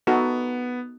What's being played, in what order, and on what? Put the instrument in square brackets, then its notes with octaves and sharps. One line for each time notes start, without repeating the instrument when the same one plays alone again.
[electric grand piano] B3 [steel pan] D#4 F#4 A4